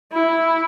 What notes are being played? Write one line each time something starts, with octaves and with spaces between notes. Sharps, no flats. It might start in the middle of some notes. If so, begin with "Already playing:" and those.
E4